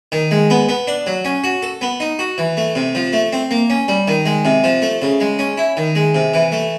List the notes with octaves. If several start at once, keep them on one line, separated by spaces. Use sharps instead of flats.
D#3
G#3
B3
B3
D4
F#3
C#4
F#4
A4
B3
D#4
F#4
E3
A3
C3
F3
A3
C4
A#3
C#4
G3
D#3
G#3
C3
F3
A3
C#3
G#3
C#4
E4
D#3
G#3
C3
E3
A3